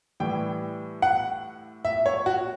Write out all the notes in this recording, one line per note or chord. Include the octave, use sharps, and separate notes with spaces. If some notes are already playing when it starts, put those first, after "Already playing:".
A2 E3 G3 G5
F#5
E5
C#5
F#4